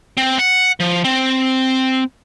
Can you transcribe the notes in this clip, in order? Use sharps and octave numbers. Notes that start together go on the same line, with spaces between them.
C4
F#5
F3
C4